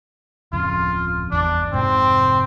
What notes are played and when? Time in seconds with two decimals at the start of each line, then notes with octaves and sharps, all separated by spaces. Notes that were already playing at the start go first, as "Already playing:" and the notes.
0.53 D1 F2 C#3 F4
1.32 G1 E2 D4
1.73 F1 G#2 C3 C4